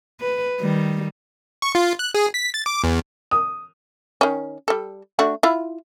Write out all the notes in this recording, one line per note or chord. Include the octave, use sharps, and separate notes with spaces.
B4
D#3 G3
C#6
F4
F#6
G#4
B6
A6
D6
E2
D#6
D#3 C#4
G3 A4
A3 D4 F#4
E4 F4